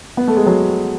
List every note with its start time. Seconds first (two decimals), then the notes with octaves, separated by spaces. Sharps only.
0.17 B3
0.28 A3
0.37 G#3
0.46 F#3